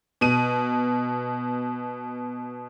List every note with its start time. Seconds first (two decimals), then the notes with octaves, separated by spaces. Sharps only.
0.21 B2 D#7